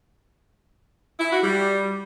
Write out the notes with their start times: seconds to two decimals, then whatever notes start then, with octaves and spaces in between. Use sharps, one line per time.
1.20 E4
1.32 F#4
1.43 G3